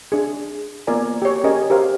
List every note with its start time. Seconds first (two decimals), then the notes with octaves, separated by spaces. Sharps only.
0.12 D4 G#4
0.87 A#3 B3 F4 A#4 D5 G#5
1.22 G4 C#5
1.44 C#4 G4 G#4 A#4 D#5 G#5
1.70 G4 A#4 C5 F5